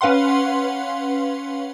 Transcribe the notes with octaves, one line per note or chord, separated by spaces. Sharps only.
C#4 B4 F5 F#5 C6